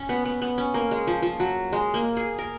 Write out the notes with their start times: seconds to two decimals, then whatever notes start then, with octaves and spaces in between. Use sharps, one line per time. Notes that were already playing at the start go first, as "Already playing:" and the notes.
Already playing: C#4
0.09 B3
0.25 B3
0.42 B3
0.58 C#4
0.74 A#3
0.91 G#3
1.07 F3
1.22 F3
1.40 F#3
1.73 G#3
1.94 A#3
2.17 G#4
2.38 A#4